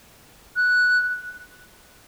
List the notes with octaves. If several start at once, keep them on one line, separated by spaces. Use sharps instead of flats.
F#6